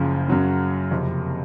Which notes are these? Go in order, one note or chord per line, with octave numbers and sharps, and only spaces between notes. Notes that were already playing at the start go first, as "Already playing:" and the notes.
Already playing: F#1 F#2 C#3 F3
F#2 C#3 F#3 C#4
F#1 F2 C3